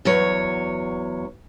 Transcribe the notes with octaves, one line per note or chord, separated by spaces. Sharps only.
E2 F#3 C#5